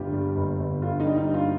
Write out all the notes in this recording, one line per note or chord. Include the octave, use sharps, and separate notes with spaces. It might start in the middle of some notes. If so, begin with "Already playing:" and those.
Already playing: G1 G2 G3 F4 G4
G3
G1
G1
D3 F4
D#4
G3
D#4
G2
F4